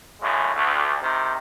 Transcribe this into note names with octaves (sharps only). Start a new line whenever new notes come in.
F#2 A2 C#3 G#3
D2
C3 D#3